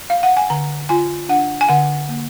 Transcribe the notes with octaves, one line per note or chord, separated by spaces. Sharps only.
F5
F#5
G#5
D3 A#5
F4 G#5
D4 F#5
G#5
D3 F#5
A#3